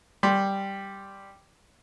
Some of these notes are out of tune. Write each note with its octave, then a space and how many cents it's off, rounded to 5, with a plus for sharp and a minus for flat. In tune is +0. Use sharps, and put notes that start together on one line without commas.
G3 +0 C6 +0